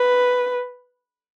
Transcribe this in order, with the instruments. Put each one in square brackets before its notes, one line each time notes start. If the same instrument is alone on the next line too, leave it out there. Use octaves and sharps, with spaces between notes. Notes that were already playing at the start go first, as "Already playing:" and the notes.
Already playing: [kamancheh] B4